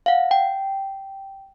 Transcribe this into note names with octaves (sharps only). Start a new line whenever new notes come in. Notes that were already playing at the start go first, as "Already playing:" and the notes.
F5 F#5
G5